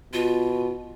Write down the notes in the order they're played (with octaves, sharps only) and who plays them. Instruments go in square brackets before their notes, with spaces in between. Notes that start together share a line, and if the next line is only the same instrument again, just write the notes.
[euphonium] B2 [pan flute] F4